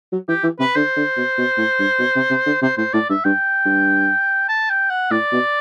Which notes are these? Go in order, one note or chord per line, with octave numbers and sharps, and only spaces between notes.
F#3
E3 G4
E3
C3 B4
D3 C5
D3
B2
B2
A2
G2
B2
C3
C3
D3
C3 C5
A2 C5
A2 D5
G2 E5
G2 G5
G2
A5
G5
F#5
A2 D5
B2